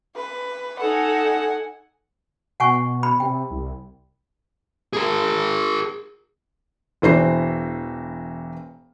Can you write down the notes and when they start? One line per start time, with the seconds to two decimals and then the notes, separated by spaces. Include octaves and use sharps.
0.16 B4
0.80 D#4 A4 F#5 G#5
2.60 B2 F#5 G#5 C#6
3.03 B5
3.20 C3 G5
3.50 C2
4.93 G#4 A#4
7.02 E1 E3 C5 C7